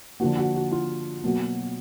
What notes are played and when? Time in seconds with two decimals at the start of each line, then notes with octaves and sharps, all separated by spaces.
0.20 D3 F3 A#3 F#4
0.37 F#4
0.55 F#4
0.71 F4
1.23 B2 F#3 A#3